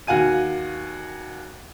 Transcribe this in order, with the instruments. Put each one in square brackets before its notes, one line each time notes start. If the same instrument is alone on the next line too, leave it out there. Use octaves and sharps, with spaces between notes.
[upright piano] D#2 F#4 F5 G#5 D#7